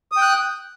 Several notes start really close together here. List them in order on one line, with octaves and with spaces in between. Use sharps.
D#6 G5 F#6